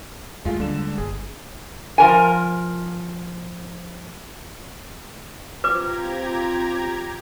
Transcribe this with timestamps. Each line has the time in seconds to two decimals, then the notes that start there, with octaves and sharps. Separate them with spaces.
0.45 D#2 G#3 A3 F4
0.60 D3 G3 G#3 A#3 E7
0.98 G1 G#4
1.98 F3 A#4 G#5
5.64 C4 F4 G4 B4 A#5 D6 G#6